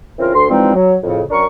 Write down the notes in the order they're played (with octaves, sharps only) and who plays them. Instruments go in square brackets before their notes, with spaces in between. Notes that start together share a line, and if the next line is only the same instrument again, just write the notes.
[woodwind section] C#3 E3 C4 F4 A#4
D2 C6
E3 F3 G3 G#3 C4 D#4
F#3
F2 A2 C#3
F#2 D4 A#4 C#6